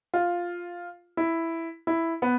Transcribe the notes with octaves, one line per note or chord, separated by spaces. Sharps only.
F4
E4
E4
B3